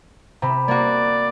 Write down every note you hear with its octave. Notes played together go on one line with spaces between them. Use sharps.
C3 A#5 B5
A#3 F#4 D5